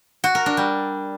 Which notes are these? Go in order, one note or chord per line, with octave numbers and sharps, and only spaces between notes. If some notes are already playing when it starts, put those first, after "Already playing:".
F#4
A#4
D4
G3